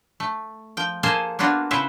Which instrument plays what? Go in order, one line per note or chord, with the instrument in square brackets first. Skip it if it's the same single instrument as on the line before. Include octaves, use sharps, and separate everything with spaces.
[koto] A3
F3 G5
A#3 G#4 A4 C5 G#5 A5
A#3 B3 D4 F4 F#4
C#3 E4 B4 C5 E5